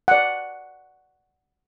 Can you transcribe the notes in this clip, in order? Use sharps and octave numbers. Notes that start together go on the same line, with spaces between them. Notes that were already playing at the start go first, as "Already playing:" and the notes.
D5 F#5